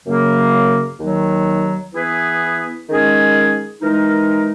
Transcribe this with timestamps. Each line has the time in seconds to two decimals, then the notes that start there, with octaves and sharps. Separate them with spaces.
0.05 F#2 C#3 F#3 A#3
0.99 D#2 D#3 F#3
1.94 E3 B3 E4 G#4 B4
2.87 D#3 G#3 C#4 G#4
3.81 E3 G#3 D#4 A#4